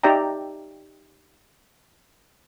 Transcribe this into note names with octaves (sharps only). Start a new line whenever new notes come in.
D#4 G4 D5 E5 G5 A#5